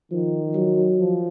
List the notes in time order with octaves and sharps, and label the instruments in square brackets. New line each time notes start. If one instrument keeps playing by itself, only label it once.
[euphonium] D#3 [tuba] F3
[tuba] F#3
[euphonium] F3